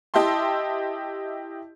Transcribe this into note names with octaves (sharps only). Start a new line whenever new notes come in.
E4 G4 D#5 E5 A5 C6